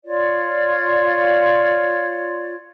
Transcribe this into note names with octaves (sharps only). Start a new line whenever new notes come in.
F4 C#5 D5